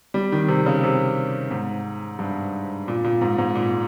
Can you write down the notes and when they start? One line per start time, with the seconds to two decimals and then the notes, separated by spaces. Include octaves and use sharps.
0.14 G3
0.32 D#3
0.48 C3
0.66 C#3
0.83 C3
1.50 G#2
2.19 G2
2.88 A#2
3.04 A#2
3.21 G#2
3.38 G#2
3.55 A#2